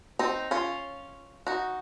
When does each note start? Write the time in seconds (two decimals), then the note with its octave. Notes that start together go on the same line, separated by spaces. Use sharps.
0.19 C4 D#4
0.51 C#4 F4
1.47 D#4 F#4